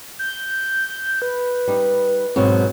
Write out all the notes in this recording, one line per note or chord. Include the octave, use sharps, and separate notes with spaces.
G6
B4
G3 D#4
G#2 B2 F#3 C4